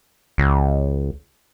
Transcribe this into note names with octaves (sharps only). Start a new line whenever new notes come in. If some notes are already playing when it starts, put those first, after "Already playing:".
C#2